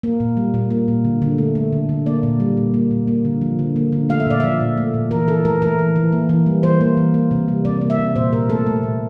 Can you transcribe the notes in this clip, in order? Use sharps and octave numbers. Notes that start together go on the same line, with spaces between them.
A#3
A#2
G3
A#2
A#3
A#2
D3
D3
A3
A3
D3
D3
A#3 D5
A#2
G3
A#2
A#3
A#2
A#3
D3
F3
D3
A#3
D3
A3 F5
E5
A#2 D5
F3 E5
A#2
A3
A#2
E3 A#4
E3 A4
A3 A#4
A3 A#4
E3
E3
A#3
E3
G3
E3 C5
A#3
E3
A#3
C3
G3
C3 D5
A#3
E5
C3
A#2 C5
A#2 A#4
A3 A4
A3
A#2